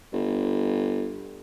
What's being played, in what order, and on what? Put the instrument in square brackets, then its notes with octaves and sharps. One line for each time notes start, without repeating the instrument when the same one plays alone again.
[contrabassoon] G1